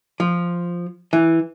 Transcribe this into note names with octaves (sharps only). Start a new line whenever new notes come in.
F3
E3